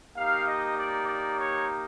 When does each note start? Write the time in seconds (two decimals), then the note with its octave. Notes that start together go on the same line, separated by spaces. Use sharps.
0.15 A#3 D#4 G4 F5
0.47 D#5
0.78 D5
1.08 D5
1.39 C#5